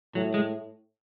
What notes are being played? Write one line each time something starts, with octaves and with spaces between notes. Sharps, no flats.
A2 F#3
G#3